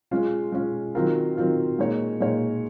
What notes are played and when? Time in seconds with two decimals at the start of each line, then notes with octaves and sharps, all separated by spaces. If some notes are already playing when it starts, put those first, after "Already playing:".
0.11 G#3 C#4 F4
0.52 G#3 C#4 F4
0.95 D#3 F#3 C4 F4 A#4
1.37 D#3 F#3 C4 F4 A#4
1.79 A#2 G#3 D#4 A#4 C#5
2.20 A#2 G#3 D#4 A#4 C#5